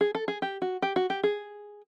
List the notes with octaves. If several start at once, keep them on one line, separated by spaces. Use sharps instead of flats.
G#4
A4
G#4
G4
F#4
G4
F#4
G4
G#4